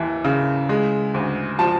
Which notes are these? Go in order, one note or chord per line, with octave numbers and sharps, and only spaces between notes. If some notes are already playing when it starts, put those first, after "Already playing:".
Already playing: D#2 E3
C#3
G#3
D2
F3 A5